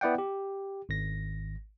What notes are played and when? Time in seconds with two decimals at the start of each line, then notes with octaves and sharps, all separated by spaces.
0.01 B3 E4 D5 F#5 G5
0.18 G4
0.89 G#1 A#6